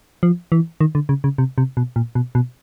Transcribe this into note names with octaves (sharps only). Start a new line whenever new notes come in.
F3
E3
D#3
D3
C#3
C#3
C3
C3
B2
A#2
B2
B2